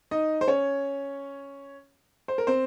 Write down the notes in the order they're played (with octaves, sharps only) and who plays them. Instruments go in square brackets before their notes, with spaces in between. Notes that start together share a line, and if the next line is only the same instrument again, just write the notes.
[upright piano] D#4 D#5
C5
C#4 C#5
C5
A#4
C4 C5